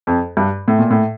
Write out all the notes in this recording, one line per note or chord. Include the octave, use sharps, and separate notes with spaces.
F2
G2
A2
A#2
A2